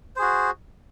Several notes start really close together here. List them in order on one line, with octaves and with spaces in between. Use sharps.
C5 G#4 F#4